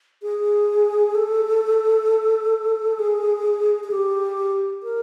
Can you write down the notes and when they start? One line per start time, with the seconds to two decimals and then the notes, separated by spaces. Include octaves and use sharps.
0.22 G#4
1.15 A4
2.99 G#4
3.84 G#4
3.91 G4
4.83 A#4